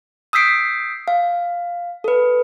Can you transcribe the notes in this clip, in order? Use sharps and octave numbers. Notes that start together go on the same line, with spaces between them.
D#6 E6 G6 B6 C7 D7
F5
A4 B4